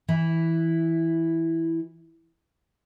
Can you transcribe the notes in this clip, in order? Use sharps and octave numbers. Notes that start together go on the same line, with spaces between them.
E3 E4